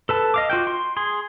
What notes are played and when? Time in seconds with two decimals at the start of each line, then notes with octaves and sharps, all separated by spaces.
0.09 A4 B4 A5
0.34 D#5 F5 D6
0.50 F4 F#4 G5
0.67 C6
0.97 G#4 C6